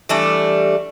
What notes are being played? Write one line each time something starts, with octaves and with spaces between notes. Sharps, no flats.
E3 G3 A3 D4